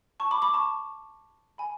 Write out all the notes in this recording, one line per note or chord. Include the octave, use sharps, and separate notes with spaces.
A5 C#6
B5 D6
B5 D6
A5 C#6
G#5 B5